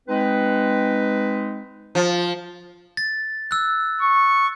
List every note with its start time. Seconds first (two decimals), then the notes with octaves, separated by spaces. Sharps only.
0.08 G#3 C4 D#4 B4
1.95 F3
2.97 A6
3.51 E6 F#6
4.01 C#6